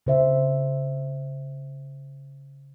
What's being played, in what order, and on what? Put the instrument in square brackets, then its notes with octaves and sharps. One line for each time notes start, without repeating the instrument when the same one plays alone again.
[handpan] C#3 C5 E5